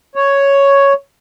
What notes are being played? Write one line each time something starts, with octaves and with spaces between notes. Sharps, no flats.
C#5